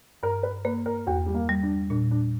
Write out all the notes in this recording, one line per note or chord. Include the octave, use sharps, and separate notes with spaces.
G2 A#4
B4
A#3 B4
A#4
E2 F#4
G3
A#3
G3
D4
A#2 D4
D4